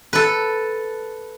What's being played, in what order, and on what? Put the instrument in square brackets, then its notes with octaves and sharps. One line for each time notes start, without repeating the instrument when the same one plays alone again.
[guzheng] A4 B4